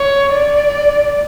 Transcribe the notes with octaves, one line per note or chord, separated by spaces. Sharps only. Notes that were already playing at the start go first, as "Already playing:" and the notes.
Already playing: C#5
D5